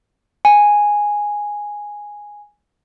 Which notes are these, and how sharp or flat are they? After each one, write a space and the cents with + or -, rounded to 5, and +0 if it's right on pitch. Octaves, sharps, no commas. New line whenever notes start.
G#5 -5